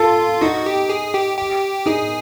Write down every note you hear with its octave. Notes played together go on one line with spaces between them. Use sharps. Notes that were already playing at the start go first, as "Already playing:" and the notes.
Already playing: F4 A4
D#4 F#4
G4
G#4
G4
G4
D#4 G#4